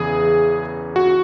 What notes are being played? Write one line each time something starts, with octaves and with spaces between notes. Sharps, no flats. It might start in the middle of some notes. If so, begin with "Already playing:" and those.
Already playing: E2 C#3 E3 G#4
F#4